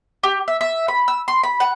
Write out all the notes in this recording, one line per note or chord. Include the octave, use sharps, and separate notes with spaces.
G4
E5
E5
B5
E6
C6
B5
F#5